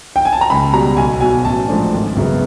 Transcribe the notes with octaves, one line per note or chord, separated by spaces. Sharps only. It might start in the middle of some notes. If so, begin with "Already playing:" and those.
G5
G#5
A5
A#5
C#2 B5
B2 G3 A#5
B1 G#5
B2 F#3 G#5
A1 A5
G#2 F3 A3 D4
G#1
F#2 C#3 F#3 B3